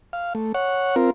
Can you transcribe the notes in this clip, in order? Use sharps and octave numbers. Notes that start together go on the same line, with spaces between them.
F5
A3
C#5 F#5
C4 F4 A#4